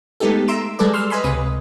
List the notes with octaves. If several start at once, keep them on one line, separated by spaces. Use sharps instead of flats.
G#3 A3 B3 D#4 G4 A4
E5 A#5 C6 D7 E7
G3 G#3 G#4 A4 B4 D5
C6 E6 F6
B4 D#5 G#5 B5 C6
C#2 C3 B4 D#6